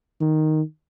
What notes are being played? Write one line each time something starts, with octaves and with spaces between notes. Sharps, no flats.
D#3